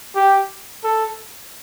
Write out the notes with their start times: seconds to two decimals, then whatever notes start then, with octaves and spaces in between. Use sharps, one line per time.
0.16 G4
0.84 A4